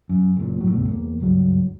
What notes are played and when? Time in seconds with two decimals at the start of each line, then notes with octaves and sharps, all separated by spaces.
0.09 F#2
0.37 F#1 A#2
0.58 A2 F#3
0.71 C#2 G2 B2 A3
0.89 E2 A#3
1.20 F#1 C#2 G2 F#3